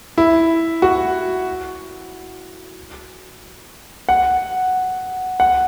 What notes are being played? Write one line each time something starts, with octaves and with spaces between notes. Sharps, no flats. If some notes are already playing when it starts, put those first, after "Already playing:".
E4
F#4
F#5
F#5